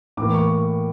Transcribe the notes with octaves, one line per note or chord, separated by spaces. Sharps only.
A2 E3 A#3 D6
C#6